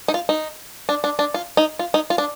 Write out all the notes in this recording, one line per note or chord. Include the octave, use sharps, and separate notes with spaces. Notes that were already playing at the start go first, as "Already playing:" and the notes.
D#4
F4
D#4
D4
D4
D4
F4
D#4
F4
D#4
F4
D4